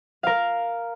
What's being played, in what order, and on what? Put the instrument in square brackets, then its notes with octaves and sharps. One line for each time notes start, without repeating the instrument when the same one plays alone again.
[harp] A#4 F5